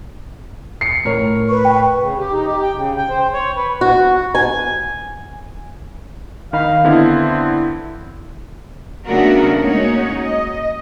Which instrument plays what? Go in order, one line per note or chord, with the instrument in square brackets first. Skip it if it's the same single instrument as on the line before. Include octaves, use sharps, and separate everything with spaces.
[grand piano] C7 C#7
A2 A#4 C#5
[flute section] B4 C#6
[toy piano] G5
[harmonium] C#3
G4
D#4
G4
G5
C#3
G5
C5
C#5
B4
[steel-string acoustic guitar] F#4
G#5
[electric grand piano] D#3 D#4 B5 [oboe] F5
[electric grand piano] D3 B3 E4 [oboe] C4
[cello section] C#3 A3 B3 D4 F#4 A#4
G#3 A#3 C#4 D#4 F#4 C#5
D#5